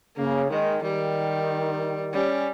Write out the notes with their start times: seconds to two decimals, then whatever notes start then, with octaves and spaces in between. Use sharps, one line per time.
0.17 C#3 A#3
0.50 D#3 G#3
0.83 D#3 G3
2.13 G3 C#4